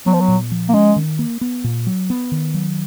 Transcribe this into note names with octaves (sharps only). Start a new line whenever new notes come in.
F#3 B3
F3
F#3
A#2
F3
A#3
G#3 C#4
D#3
A#3
B3
A#2
F#3
B3
D#3
F#3